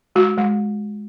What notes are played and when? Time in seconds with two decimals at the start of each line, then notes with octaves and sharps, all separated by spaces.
0.16 G#3 F#4
0.37 G#3